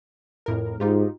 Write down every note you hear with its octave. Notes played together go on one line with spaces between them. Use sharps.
F2 A2 A#4
G#2 D#4 F4 G4